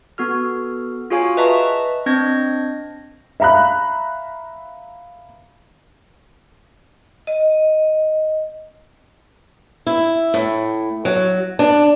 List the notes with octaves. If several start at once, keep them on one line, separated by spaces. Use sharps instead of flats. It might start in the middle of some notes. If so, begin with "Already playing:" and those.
B3 F#4 A4 F6
F4 F#4 G#4 C#5 F5 G#5
B4 D#5 E5 A5 A#5 C#6
C4 D4 D#5 G6 G#6 A#6
E5 F5 A#5 B5 F#6
D#5
E4
A2
F#3
D4